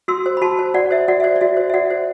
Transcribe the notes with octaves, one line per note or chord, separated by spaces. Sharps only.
F#4 C6 E6
C5
B5
F#4 A5 C6
C5
F#4 D5 F#5
C5 E5
F#4 D5 F#5
E5
C5 D5
D5
F#4 E5
C5
E5
F#4 D5 F#5
C5